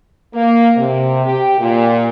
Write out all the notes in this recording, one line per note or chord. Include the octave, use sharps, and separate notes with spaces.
A#3
C3
G4
A#2